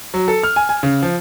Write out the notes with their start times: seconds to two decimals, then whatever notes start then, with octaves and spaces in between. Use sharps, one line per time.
0.14 F#3
0.28 A4
0.43 F6
0.56 G#5
0.69 G#5
0.83 C#3
1.03 F3